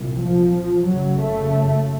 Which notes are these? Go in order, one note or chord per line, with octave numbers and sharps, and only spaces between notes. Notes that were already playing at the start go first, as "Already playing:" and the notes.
Already playing: C2 A#2
F3
F#1 F#2 C#3 F#3
A3